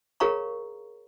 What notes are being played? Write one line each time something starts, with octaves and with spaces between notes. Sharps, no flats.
G#4 A#4 C#5 F5 A#5 C#6